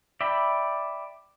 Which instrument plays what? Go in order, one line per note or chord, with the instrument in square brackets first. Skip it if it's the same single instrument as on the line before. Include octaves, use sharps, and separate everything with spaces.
[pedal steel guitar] D5 E5 G5 B5